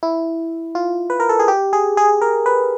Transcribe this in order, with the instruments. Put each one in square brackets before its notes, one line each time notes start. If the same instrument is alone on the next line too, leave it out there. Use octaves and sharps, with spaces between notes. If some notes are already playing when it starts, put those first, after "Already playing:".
[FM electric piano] E4
F4
B4
A#4
A4
G#4
G4
G#4
G#4
A#4
B4